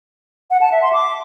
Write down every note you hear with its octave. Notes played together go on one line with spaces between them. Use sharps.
F#5
A5
E5
C6
D6